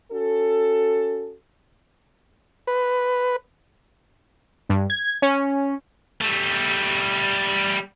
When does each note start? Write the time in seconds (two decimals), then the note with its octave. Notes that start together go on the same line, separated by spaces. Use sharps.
0.12 C#4 F#4 A4
2.67 B4
4.69 G2
4.90 G#6
5.22 C#4
6.21 G3 A3